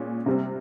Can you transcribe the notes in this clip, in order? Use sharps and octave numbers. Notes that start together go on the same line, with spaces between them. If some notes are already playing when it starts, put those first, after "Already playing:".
Already playing: A#2 G#3 C#4
C3 G3 C4